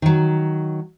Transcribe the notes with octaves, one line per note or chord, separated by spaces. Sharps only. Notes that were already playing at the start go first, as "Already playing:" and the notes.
D#3 F#3